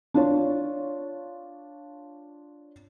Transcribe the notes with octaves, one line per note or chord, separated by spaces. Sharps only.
D4 F4 C#5